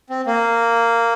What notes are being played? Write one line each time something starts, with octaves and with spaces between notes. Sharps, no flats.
C4
A#3